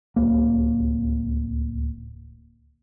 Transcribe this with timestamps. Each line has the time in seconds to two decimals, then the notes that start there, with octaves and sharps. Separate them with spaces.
0.16 D1 G#1 C#2 A#3